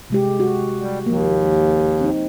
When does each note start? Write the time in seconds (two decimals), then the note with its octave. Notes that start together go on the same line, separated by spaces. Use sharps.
0.10 C3 G#3 G4
0.40 F#4
0.80 G3
1.06 D#2 F3 A#3
2.01 C4 D#4